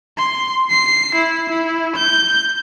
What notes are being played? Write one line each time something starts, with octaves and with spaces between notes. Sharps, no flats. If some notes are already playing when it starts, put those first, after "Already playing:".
C6
C7
E4
E4
G6